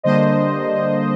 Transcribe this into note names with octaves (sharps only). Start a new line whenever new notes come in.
D3 G3 A#3 D4 C5 D#5